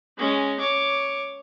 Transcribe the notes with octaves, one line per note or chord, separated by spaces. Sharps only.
G#3 C#4
C#5 D6